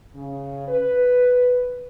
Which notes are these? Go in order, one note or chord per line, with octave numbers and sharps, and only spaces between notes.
C#3
B4